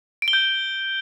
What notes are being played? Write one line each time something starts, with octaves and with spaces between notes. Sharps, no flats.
D7
G7
G6